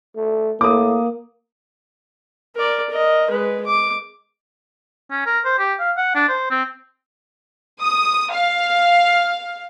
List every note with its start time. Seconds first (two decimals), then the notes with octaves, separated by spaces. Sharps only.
0.16 A3
0.61 A2 A#3 D6 D#6
2.56 A#4 D5
2.90 A#4 D#5
3.30 G#3 B4
3.66 D6
5.11 C#4
5.26 A#4
5.45 C5
5.59 G4
5.79 F5
5.97 F#5
6.15 D4
6.29 C5
6.50 C4
7.82 D#6
8.32 F5